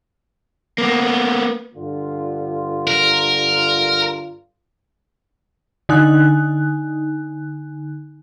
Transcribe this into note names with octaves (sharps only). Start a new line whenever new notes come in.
A#3 B3
G2 D3 F4
A#4
D3 D#4 G#5 F#6